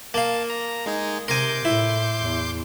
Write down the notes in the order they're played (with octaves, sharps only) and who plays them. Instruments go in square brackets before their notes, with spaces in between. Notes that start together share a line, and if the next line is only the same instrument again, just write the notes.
[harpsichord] A#3 F5 [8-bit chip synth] A5
[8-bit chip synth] A#5
G#3 D#4 G#4
[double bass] C3 [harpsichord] A#4 G#5 [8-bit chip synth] C6 D6 G6
[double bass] A2 [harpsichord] E4
[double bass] E2